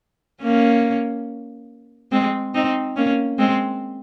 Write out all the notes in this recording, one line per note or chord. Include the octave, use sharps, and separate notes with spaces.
A#3 C#4
G#3 C4
C4 D#4
A#3 C#4
G#3 C4